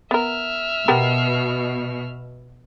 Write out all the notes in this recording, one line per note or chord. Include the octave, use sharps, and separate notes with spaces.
B3 A#4 E5 F6
B2 B3 G4 A#4